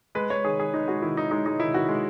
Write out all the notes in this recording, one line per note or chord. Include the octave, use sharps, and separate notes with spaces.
G#3 B4
G#3 C#5
D#3 G#4
D#3 G#4
G#3 D#4
G#3 F#4
D#3 E4
D#3 D#4
G#3 D#4
G#3 D#4
D#3 E4
D#3 F#4
G#3